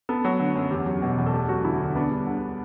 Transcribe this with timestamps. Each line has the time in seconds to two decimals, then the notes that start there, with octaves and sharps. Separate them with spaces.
0.09 B3 A4
0.24 F#3
0.39 D3
0.55 F#2
0.71 E2 G4
0.86 F#3
1.02 B2
1.18 E2
1.26 A4
1.33 A3 G4
1.49 F#3 F#4
1.64 D3 E4
1.80 D2
1.96 B3 D4
2.11 G3
2.27 D3